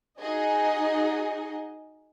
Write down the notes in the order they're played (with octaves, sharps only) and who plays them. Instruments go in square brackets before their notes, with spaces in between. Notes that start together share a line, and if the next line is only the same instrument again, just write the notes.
[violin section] D#4 F#4 G#4 D#5